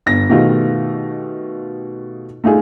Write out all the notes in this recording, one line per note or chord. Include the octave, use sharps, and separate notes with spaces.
G1 A#6
B2 D#3 A3 D#4 F4 G4
A3 D#4 F4 G#4